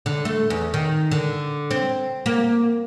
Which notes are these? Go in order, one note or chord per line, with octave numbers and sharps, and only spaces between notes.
D3
A3
E2
D#3
D3
C4
A#3